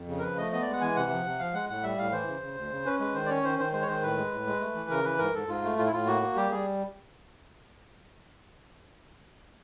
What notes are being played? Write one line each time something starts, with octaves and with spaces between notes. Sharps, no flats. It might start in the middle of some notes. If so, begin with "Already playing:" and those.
Already playing: F2
C#3
A#4
F3 B4
A3 D#5
B3 D#5
G#3 D5
F#5
E3 G#5
C3 F#5
F3
C3
F3 F5
G#3 F#5
A2 F#5
G3 E5
A2 F5
E3 C5
C#3
C#3
D2
C#3
C#4 B4
G#3 B4
D#3 C5
D5
C#4 C#5
D#3 C5
D#3 C5
G#3 C5
C#5
D#3 C5
A2 B4
G#3
A2
G#3
A3
E3
C#3 A#4
E3 B4
G#2 A#4
G#2 A4
G#2 F4
A3
A2 F4
E4
A2 F4
A#3 F#4
A#3
G3 G4
G3 G#4